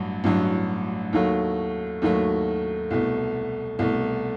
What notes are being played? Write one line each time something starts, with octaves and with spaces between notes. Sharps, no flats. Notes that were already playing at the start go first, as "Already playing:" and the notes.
Already playing: A1 G2 F#3
A1 G2 F#3
D#2 D#3 F#3 A3
D#2 D#3 F#3 A3
C2 B2 A3
C2 B2 A3